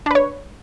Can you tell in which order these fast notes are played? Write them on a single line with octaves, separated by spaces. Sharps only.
D4 B4 C#5